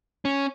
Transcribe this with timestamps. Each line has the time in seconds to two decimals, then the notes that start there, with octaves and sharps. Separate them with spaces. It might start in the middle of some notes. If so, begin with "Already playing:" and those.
0.25 C#4